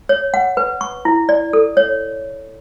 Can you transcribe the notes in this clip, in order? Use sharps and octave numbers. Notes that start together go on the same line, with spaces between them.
C#5
F#5
B4
C#6
E4
D5
A4
C#5